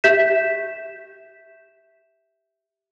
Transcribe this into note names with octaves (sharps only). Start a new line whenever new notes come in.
G4 E5 G6 B6 E7